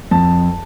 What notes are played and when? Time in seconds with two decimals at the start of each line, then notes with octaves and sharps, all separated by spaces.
0.11 F2 A5